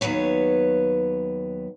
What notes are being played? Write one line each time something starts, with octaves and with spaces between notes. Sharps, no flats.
D#2 F#3 B3 B4 C#5